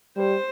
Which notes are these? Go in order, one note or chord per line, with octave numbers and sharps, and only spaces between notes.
G3 C5